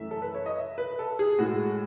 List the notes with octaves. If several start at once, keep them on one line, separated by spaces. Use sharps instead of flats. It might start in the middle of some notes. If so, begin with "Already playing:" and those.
Already playing: F#2 E3 A3 E5
A4
B4
C#5
D#5
E5
B4
A4
G#4
A2 G#3 F#4